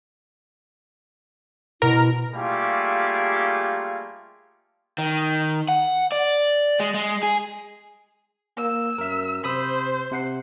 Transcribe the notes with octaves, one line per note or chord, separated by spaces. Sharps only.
B2 E4 A#4
G3 A3 A#3 F4 G4 G#4
D#3
F#5
D5
G#3
G#3
G#4
A#3 E6
F#2 A#4 E5
C3 C5 B5 D#6 E6
C3 F#5 C7